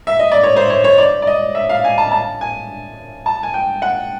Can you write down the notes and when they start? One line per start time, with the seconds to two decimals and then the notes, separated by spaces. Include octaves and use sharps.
0.07 E5
0.19 D#5
0.32 D5
0.43 C#5
0.56 C5
0.70 C#5
0.84 C#5
0.98 D5
1.22 D5
1.27 D#5
1.55 E5
1.69 F5
1.84 G#5
1.98 A5
2.12 A5
2.41 G#5
3.26 A5
3.43 G#5
3.54 G5
3.82 F#5